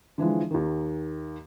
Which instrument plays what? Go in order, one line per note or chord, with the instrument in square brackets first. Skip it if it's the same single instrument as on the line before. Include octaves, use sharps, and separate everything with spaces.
[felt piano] D3 E3 F3 G#3
D#2 D#3